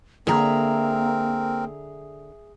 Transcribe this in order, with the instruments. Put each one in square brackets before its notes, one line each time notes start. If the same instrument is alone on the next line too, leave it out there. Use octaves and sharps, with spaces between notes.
[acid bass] D3 [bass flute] A#3 [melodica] C4 A#4 [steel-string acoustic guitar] G#4 E5 A#5